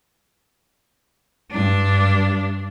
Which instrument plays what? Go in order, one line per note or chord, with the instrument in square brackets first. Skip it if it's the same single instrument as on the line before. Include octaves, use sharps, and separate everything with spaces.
[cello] G2 D4